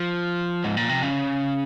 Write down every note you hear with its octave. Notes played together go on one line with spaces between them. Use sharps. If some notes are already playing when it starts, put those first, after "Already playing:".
Already playing: F3
G#2
A#2
C3
C#3